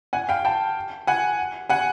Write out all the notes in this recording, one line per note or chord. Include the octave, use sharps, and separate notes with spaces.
F#5 G#5
F5 G5
G5 A5
F#5 G#5
F#5 G#5